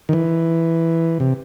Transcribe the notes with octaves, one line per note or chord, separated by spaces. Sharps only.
D#3
E3
C3